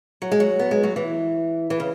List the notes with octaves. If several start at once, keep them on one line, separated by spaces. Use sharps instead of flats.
F#3
G#3
F#3
B3
G#3
F#3
E3
E3
C#3